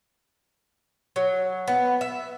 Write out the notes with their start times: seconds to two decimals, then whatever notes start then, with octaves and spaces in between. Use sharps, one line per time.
1.16 F#3
1.68 B3
2.01 E5